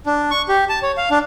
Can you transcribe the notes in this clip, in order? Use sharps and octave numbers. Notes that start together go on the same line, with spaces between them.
D4
C#6
G4
A5
C#5
F5
D4